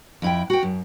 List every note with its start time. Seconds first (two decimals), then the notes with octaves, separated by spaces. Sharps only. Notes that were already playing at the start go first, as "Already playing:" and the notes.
0.22 F2 E4 G5
0.50 F#4 G5
0.63 F#2